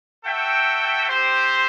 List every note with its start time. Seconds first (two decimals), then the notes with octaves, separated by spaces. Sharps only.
0.24 F#4 A4 E5 G5
1.09 C4 G4 C5